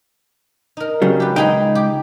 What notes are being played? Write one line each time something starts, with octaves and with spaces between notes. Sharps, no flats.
D#4 A#4
C#3 F#3 G3
G4 B4
C#2 D#4 G#4 G5 B5
G4